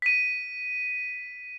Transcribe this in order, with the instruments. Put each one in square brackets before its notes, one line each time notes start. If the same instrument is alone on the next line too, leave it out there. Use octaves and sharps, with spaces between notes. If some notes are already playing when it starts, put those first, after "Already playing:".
[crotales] B6 D#7